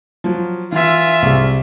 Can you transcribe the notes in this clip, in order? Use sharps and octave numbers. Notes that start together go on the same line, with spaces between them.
F3 F#3
E3 F4 E5
C2 G#4